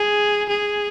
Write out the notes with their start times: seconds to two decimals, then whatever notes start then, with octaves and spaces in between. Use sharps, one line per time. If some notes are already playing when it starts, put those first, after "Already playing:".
Already playing: G#4
0.49 G#4